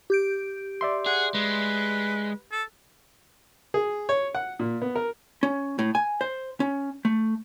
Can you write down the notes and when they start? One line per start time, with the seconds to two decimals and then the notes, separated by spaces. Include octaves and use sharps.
0.10 G4 G6 D7
0.81 D5 E5 C6
1.06 G#4 F#5
1.35 G#3 B4
2.51 A4
3.74 G#4
4.09 C#5
4.35 F#5
4.59 A#2
4.82 B3
4.95 A#4
5.43 C#4
5.79 A2
5.95 G#5
6.21 C5
6.60 C#4
7.05 A3